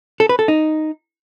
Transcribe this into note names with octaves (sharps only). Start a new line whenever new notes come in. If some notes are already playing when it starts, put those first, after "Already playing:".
A4
B4
A4
D#4